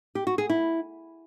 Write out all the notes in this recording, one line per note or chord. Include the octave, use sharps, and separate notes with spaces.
G4
F#4
G#4
E4